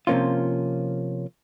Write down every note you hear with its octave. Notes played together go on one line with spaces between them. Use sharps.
C3 F3 A#3 C#4 F4